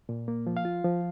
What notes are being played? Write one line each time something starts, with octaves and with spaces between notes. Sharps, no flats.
A#2
A#3
F3
F5
F4
F3